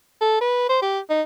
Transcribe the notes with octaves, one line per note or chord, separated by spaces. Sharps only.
A4
B4
C5
G4
D#4